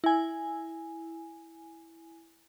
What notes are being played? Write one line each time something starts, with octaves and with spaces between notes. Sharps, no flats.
E4 G#5